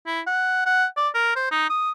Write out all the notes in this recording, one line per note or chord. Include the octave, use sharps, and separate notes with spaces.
E4
F#5
F#5
D5
A#4
C5
D#4
D#6